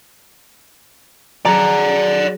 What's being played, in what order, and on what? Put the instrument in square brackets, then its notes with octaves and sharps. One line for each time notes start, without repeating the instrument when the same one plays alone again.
[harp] F#3 G#4 [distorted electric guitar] D5 F#5 [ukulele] A#5